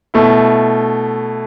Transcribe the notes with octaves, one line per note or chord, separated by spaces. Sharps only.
B2 A3 E4